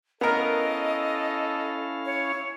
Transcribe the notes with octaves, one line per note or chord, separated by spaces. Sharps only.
B3 C#4 E4 A4 A#4 D#5 F5
C#5